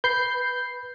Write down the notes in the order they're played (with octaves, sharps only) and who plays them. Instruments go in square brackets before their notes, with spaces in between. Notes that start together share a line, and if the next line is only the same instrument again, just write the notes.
[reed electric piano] B4 B5 [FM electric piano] G6 C7